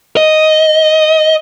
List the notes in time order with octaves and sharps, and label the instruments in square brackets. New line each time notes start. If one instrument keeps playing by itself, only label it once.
[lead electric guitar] D#5